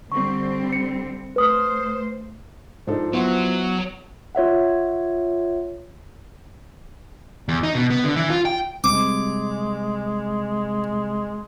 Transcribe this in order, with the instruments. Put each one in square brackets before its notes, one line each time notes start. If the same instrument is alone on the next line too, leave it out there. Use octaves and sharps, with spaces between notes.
[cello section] D3 G3 C4 [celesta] C#6
[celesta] C#7
[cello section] A3 C5 [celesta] B4 D#6 F6
[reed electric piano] G#2 D#4 [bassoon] F3 [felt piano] D4 A4
[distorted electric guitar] F#3 [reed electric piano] B3 [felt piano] E4 F#5 C6
[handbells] F4 C#5 E5 F#5
[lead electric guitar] E2
D#4
B2
B3
D3
E3
F4
G5
[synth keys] C3 G3 C4 [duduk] G#3 [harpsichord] D6